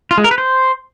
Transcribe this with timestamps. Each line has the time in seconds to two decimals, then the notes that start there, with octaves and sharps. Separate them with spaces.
0.11 F4
0.18 G#3
0.24 A#4
0.31 B4
0.38 C5